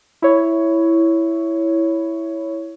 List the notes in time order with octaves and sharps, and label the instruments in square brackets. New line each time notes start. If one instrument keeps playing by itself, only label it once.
[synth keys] E4 C#5